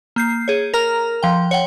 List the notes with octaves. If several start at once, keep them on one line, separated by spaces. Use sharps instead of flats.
A#3 G6 C7
G#4 C#5
A#4 A#5 F6
F3 G5
C#5 F#5 G5